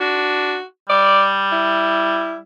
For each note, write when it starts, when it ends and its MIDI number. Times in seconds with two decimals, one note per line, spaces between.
0.01 0.55 62
0.01 0.63 66
0.90 2.43 55
0.90 1.29 74
1.52 2.37 64